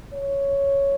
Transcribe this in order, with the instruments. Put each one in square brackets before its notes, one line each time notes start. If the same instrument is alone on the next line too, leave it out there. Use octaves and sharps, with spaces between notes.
[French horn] C#5